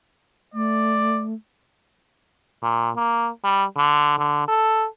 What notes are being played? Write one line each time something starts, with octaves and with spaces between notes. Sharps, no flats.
A3 D5
A#2
A#3
G3
D3
D3
A4